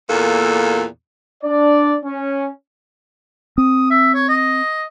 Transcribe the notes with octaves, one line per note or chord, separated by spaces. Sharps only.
E2 A#2 A#3 A4
D4 D5
C#4
C4 D#6
E5
C#5
D#5